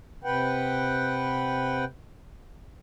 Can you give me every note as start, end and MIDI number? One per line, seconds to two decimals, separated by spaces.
0.24 1.85 48
0.24 1.85 71
0.24 1.85 78
0.24 1.85 79